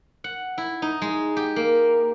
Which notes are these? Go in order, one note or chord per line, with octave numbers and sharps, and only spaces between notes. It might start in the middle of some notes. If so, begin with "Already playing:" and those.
F#5
E4
D#4
G#3
G4
A#3